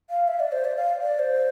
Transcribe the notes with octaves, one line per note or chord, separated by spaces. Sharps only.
F5
E5
D5
C5
D5
F5
D5
C5